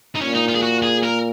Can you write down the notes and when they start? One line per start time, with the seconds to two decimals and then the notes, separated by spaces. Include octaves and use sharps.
0.16 D#4
0.20 A#2 C#4
0.35 D#4
0.49 F4
0.55 G#4
0.62 F#4
0.82 G#4
1.03 A#4